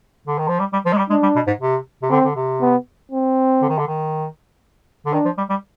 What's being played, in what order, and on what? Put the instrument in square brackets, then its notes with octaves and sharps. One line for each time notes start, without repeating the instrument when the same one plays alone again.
[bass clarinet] D3
D#3
F3
G3
G3
F3
G#3
G3
[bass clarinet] G#3 [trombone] D4
[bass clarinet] G3
B2
G#2
C3
C3
[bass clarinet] D3 [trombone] C4
[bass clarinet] D3
C3
[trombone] B3
C4
[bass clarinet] D3
D#3
D3
D#3
D3
[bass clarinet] D#3 [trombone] D4
[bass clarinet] F3
G3
G3